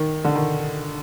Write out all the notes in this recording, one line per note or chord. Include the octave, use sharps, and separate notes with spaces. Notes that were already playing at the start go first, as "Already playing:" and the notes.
Already playing: D#3
D3
D#3